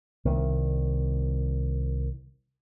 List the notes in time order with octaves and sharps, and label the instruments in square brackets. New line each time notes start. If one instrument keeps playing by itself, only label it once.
[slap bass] C2 D#3